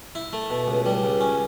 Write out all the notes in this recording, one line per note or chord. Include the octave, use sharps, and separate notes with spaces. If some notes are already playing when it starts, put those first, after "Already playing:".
E4
A3
B2
C#2
G3
C#2
C#4